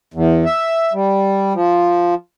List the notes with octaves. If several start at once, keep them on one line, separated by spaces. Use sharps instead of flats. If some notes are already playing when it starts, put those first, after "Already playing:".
E2
E5
G3
F3